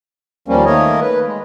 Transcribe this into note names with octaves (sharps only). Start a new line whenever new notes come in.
D#2 F3 G3 A#3 C#4
D#3 A3 A#3 A#4 C#5 D#5
B4
G#3